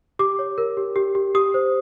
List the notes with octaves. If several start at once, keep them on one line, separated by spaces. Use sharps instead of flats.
G4 D6
C#5
A#4
G4
G4
G4
G4 D#6
C5